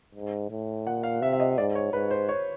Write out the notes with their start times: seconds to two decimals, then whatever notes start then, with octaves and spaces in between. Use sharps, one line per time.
0.15 G#2
0.50 A2
0.87 A#2 F#5
1.03 F5
1.21 C3 E5
1.33 E5
1.40 D#5
1.58 G#2 D5
1.75 C#5
1.93 G#2 B4
2.11 C5
2.29 C#5